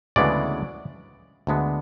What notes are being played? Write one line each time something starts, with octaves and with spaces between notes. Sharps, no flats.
D2 C#3 E3 G#3 B3 D5
D2 D3 G#3 B3